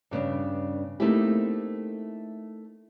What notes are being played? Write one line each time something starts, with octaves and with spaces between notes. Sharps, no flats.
G2 C#3 B3 D4
A3 A#3 C4 D#4 E4 G4